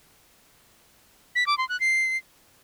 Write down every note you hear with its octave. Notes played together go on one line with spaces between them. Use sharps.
B6
D6
C6
F#6
C7